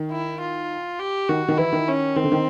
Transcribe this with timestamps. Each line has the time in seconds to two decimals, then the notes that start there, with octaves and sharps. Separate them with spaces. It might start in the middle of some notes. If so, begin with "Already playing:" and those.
Already playing: D#3
0.11 E4
0.41 F4
1.00 G4
1.29 D#3 F#4
1.48 D#3
1.58 E3 E4
1.73 D#3
1.88 C#4
2.16 D#3 C4
2.24 D3
2.32 D#3